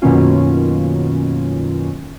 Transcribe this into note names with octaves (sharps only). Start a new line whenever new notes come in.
F#2 B2 D#3 A#3 C#4 F4